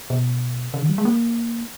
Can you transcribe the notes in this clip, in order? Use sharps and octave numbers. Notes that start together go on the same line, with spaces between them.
B2
C#3
D#3
G3
G#3
A#3